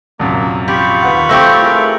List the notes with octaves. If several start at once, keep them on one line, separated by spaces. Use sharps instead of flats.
A#1 F#2 C3 A#3
F4 G4 B5 C#6
D#2 B4 F#5
A3 C4 G4 F5 A#6
E4 G#4 A#4